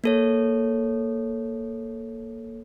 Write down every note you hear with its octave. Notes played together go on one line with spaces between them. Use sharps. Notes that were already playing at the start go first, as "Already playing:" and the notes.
A#3 A4 C#5